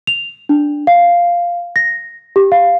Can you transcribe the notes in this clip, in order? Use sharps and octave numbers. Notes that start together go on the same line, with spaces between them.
F7
D4
F5
A#6
G4
F5